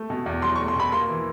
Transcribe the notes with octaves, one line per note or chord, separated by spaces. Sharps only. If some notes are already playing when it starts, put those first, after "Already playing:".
Already playing: A3
B2
E2
F#3 C6
A3 C#6
C6
B2 B5
A#3 C6
E3